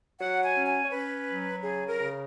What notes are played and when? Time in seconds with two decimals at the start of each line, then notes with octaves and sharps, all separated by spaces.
0.20 F#3 F#5
0.44 G#5
0.56 C#4
0.68 G#5
0.84 C#5
0.91 C#4 B4
1.28 F#3
1.64 C#3 G#4
1.87 A#4
1.99 C#3